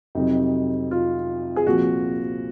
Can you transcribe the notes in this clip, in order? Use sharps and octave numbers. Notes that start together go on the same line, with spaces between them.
F2 C3 F#3 D#4
F4
G#4
C2 A#2 F3 F#4